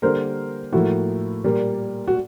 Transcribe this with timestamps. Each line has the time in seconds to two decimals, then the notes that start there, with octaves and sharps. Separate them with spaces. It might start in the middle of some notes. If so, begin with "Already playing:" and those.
0.02 D3 G3 A#3 A#4 C5
0.73 A2 F3 A#3 E4 F#4
1.44 A#2 G3 A#3
2.08 F#4